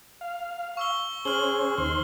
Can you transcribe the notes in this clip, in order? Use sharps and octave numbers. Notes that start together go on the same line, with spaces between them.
F5
C#6 E6 G7
C#4 G#4 C5 F6 F#7 G7
D#2 C5 C6